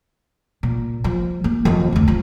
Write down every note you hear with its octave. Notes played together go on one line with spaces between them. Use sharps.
A#2
F3
A#3
F2 E3
F1 D2
F3